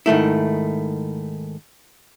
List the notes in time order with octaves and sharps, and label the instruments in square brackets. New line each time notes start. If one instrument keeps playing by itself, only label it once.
[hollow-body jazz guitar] G#2 D#3 A3 E4